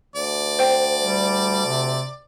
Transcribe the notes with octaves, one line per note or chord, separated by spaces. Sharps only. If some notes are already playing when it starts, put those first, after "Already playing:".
D2 D5
C5 G5
G3
C3